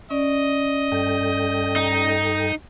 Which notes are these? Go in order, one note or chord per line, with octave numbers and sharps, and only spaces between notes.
C#4 D5 D#5
G2 A4 G5
D#4